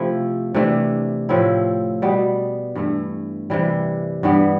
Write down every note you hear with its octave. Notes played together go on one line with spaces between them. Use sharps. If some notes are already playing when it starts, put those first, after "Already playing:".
Already playing: C3 F3 A3 E4
C3 E3 A3 D4
A2 F3 C4 E4
B2 G3 B3
G2 E3 A3
C3 E3 G3
G2 E3 G3 B3